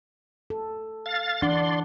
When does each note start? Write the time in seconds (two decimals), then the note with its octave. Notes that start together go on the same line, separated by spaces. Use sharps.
0.50 A4
1.06 F5 A6
1.42 E3 D4 D5 F#5 C6